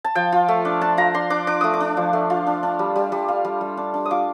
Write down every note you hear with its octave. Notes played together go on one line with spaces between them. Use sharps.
A5
F3 G5
F4
A3
D4
D4 A5
F4 A#5
D4 C6
D4 D6
D4 D6
A3 D#6
D6
D4
F3
A3
F4
D4
D4
G3
G3
G3
F4
G3
G3
D4
D4
D#6
F4 D6